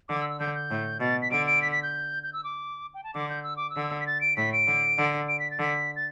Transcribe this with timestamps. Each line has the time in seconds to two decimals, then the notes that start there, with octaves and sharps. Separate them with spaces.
0.09 D3 D6
0.19 E6
0.30 E6
0.40 D3 G6
0.55 G6
0.70 A2
1.00 B2 A6
1.22 B6
1.31 D3 D7
1.46 D7
1.62 B6
1.72 B6
1.83 G6
2.23 G6
2.33 E6
2.44 D6
2.94 G5
3.04 A5
3.14 D3 D6
3.29 G6
3.44 E6
3.57 D6
3.70 E6
3.76 D3
4.00 B6
4.07 A6
4.21 D7
4.37 A2 B6
4.53 D7
4.67 D3
4.98 D3
5.28 D7
5.40 B6
5.51 A6
5.59 D3 B6
5.96 A6